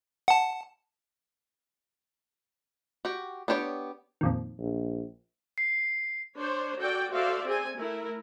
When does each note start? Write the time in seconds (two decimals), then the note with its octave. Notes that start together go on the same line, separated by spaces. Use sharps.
0.28 F#5 A5
3.05 F#4 G4
3.48 B3 D4 G4 C5 C#5
4.21 F2 A#2 D#3
4.58 A#1
5.58 C7
6.37 D4 C5 C#5
6.79 F#4 A4 D5 G5
7.12 F#4 A4 C5 D5 E5 F5
7.46 C4 G#4 A4 G#5
7.77 A3 E4 A#4